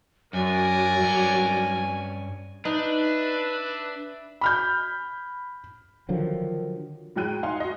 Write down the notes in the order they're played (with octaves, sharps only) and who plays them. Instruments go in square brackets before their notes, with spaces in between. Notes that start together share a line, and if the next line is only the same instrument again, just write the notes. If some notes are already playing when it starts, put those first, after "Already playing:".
[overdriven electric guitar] F#2 [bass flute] F#3 [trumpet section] D4 A#4 D5 [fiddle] G#5
[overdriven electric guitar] G2 C#4
[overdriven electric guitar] D4 [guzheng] D#4 [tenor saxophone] B4 [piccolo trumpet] E5
[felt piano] B5 F6 G6
[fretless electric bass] D3 F3 F#3 [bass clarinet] D#3
[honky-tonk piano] A2 F#3 G#3 G5 F#6 D#7
D#4 F5 F#5 G#5 C6
F#4 D#5